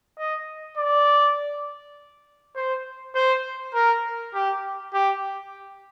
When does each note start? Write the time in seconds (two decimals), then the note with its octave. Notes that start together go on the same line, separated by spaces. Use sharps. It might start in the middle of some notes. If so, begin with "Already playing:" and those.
0.18 D#5
0.77 D5
2.56 C5
3.15 C5
3.74 A#4
4.34 G4
4.94 G4